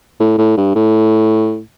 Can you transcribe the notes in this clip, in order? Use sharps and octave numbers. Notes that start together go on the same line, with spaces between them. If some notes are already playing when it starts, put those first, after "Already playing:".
A2
A2
G2
A2